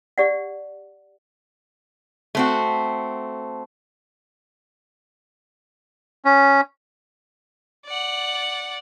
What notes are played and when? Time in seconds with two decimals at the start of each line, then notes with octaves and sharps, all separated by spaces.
0.18 G4 D5 F#5
2.35 A3 C4 F#4
6.25 C#4
7.86 D5 F#5